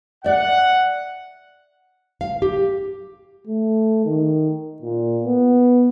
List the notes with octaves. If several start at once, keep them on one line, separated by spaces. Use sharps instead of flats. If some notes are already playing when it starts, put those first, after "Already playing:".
D5 E5 F#5
F5
G4
A3
D#3
A#2
B3